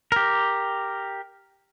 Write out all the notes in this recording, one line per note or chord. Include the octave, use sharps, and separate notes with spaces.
G4 A#4